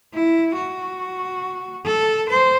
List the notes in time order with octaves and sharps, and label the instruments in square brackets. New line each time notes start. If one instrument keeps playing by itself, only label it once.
[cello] E4
F#4
A4
C5